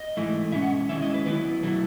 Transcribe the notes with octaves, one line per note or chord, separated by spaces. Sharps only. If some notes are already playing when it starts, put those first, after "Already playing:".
Already playing: D#5
G#2 E3 A3 E4
B2 G#3 C#4 E5
F#5
D#3 G#3 C#4 E4 E5
D#5
B4
D#3 F#3 B3 E4 B4
B2 F#3 A3 E4